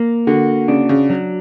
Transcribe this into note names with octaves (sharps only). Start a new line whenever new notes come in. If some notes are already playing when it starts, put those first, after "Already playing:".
Already playing: A#3
D3 F#4
C#3 D4
C#3
F#3